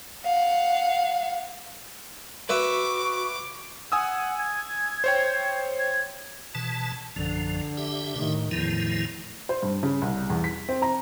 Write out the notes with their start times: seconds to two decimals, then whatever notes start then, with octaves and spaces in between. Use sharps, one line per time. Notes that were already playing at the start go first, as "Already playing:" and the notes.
0.24 F5 F#5
2.49 F#4 B4 E5 F#5 C#6 D6
3.92 F#5 G#5 D#6 E6
4.38 G#6
5.04 C5 C#5 G5
5.79 G#6
6.55 B2 E3 A5
7.16 A#1 F#2 D3 F3
7.77 G4 E5
8.16 A2 D#3
8.51 E2 A2 D#3 F3 E4
9.49 C5
9.63 G2
9.83 C#3
10.02 C2
10.30 E2
10.44 B6
10.69 C4
10.82 A#5